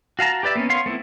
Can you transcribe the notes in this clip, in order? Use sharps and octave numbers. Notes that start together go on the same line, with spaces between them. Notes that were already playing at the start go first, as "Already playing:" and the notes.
F#4 F5 A5 A#5
G4 B4 D5 E5
A#3 B3 C#4
B3 C#5 F5 C6
A3 B3 C4 E4